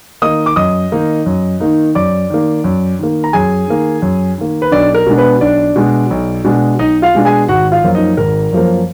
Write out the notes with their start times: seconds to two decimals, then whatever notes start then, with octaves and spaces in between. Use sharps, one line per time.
0.22 D#3 A#3 D#4 D#5 D#6
0.46 D6
0.56 F#2 D#5 D#6
0.92 D#3 A#3 D#4
1.26 F#2
1.60 D#3 A#3 D#4
1.95 F#2 D5 D6
2.30 D#3 A#3
2.64 F#2
2.99 D#3 A#3
3.24 A#5
3.33 F#2 G#4 G#5
3.68 D#3 A#3
4.02 F#2
4.38 D#3 A#3
4.62 B4
4.71 B1 D4 D5
4.94 A#4
5.06 B2 G#3 D4
5.18 B3 B4
5.41 B1 D4 D5
5.76 B2 G#3 D4
6.10 B1
6.44 B2 G#3 D4
6.79 B1 D#4 D#5
7.02 F4 F5
7.15 B2 G#3 D4
7.25 G#4 G#5
7.48 G#1 F#4 F#5
7.72 F4 F5
7.84 F#2 F3 A#3
7.95 D#4 D#5
8.17 G#1 A#4
8.53 F#2 F3 A#3